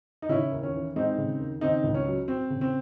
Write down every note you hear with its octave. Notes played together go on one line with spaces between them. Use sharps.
D#4
C#3 C#4 E4
D#2
C#4
E3
G#3 C4 D#4
C#3
D#2
C#3 C4 D#4
C#2
C#4
F#3
C4
C#3
C4